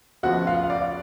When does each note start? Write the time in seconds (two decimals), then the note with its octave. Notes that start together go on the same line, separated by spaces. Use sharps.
0.23 D2 C#3 F3 B3 F4 F#4 F#5
0.47 F4 F5
0.63 F5
0.70 D5